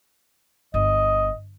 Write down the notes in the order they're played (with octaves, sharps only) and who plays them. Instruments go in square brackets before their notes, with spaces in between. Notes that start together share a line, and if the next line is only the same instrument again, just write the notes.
[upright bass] G1 [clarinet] D#5